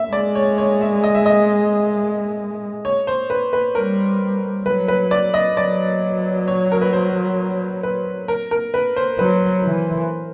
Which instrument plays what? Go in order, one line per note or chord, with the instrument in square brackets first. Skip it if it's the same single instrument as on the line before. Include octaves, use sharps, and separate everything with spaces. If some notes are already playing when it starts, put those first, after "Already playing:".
Already playing: [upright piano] E5
[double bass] G#3 [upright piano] D5
[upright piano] C#5
C#5
E5
D#5
E5
D#5
C#5
C5
B4
B4
[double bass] G3 [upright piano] A#4
[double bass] F#3 [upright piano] B4
[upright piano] B4
D5
D#5
[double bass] F#3 [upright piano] D5
[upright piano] C#5
A#4
B4
C5
B4
A#4
A#4
B4
C5
[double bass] F#3 [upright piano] B4
[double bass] E3